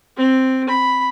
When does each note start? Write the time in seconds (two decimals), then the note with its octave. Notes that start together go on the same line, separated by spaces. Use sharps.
0.17 C4
0.69 B5